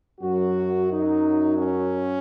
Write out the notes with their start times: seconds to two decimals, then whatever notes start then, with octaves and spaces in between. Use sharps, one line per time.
0.21 F#2 F#3 F#4
0.90 D#4
1.58 C#4